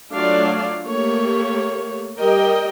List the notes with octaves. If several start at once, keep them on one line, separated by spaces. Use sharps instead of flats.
F#3 A3 D4 F4 D5 F5
A3 A#3 G4 C#5
G3 G4 A#4 D#5 G5